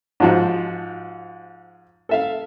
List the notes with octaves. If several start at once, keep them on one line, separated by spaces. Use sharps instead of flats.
G#2 F3 F#4
A4 E5 F5